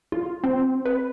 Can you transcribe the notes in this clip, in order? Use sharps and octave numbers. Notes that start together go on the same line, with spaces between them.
F4
C4
B4